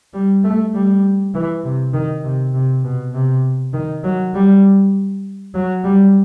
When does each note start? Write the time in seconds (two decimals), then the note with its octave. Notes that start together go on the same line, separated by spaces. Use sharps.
0.13 G3
0.44 A3
0.74 G3
1.34 E3
1.64 C3
1.94 D#3
2.24 C3
2.54 C3
2.84 B2
3.14 C3
3.74 D#3
4.03 F#3
4.34 G3
5.54 F#3
5.84 G3